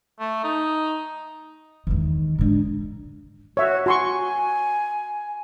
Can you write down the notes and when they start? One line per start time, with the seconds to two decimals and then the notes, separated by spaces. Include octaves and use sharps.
0.20 A3
0.44 D#4
1.87 E2 D#3
2.38 G#2 D3
3.57 F#4 C#5 E5
3.86 F#4 G#5 C6 C#6